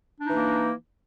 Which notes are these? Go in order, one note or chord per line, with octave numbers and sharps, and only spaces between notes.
E3 A#3 D4 D#4